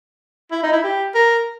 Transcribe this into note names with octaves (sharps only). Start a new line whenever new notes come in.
E4
D#4
E4
G4
A#4